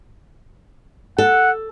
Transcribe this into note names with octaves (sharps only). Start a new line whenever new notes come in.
A4 F#5